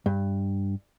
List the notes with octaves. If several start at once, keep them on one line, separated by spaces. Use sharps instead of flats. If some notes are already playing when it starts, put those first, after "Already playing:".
G2